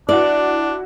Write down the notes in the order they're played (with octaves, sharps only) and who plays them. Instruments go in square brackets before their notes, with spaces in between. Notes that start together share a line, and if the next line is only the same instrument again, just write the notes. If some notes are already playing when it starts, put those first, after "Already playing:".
[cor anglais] D4 [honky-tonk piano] E4 F#4 [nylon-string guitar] D5